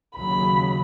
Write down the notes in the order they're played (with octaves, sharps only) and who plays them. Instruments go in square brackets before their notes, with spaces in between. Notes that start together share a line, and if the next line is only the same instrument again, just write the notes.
[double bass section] D#2 C#3 F#3 [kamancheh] B5